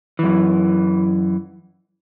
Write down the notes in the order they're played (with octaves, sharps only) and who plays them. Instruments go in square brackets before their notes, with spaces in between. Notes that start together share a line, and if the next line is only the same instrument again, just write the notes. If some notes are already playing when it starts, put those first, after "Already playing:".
[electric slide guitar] F#2 E3